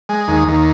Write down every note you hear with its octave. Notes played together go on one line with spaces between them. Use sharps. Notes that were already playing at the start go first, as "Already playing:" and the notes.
G#3
D#2
D#2